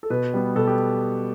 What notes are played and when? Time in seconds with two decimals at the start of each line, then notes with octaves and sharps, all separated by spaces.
0.03 A4
0.10 B2 B4
0.34 G3 B3
0.55 B2 A4
0.67 G4